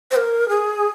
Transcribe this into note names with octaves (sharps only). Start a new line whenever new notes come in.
C5
A#4
G#4